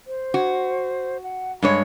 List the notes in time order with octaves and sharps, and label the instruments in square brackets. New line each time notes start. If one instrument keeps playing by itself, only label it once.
[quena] C5
[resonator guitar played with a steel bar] F#4
[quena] F#5
[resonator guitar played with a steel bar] G2 G#3 C#5 [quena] B5